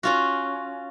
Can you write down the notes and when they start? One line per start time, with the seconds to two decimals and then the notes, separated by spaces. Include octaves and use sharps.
0.03 C#4 F4 F#4